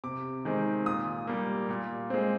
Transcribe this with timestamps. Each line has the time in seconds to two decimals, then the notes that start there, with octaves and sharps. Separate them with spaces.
0.04 C3 D6
0.45 D#3 G#3 C4
0.86 A#2 D#6
1.27 G3 A#3
1.69 A#2
2.10 G#3 C4